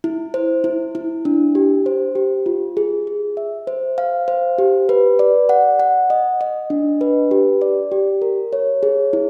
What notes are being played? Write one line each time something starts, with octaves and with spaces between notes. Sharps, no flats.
E4
C5
E4
E4
D4
G4
C5
G4
F4
G#4
G#4
E5
C5
F5
C5
G4
B4
D5
F#5
F#5
D#5
D#5
D4
B4
G4
D5
G4
A#4
C#5
G#4
E4